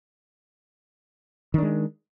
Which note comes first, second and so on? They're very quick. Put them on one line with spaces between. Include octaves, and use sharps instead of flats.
D#3 D4 G#3